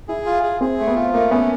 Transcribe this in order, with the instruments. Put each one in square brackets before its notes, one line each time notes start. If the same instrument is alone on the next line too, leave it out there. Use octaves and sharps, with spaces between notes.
[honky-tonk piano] E4 [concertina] G#4
[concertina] F4
G#4
[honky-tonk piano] C4 [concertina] G#4
[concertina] A3
[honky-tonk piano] B3
[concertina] F4
[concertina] A3 [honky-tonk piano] A#3
[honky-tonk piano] B3 [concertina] C#4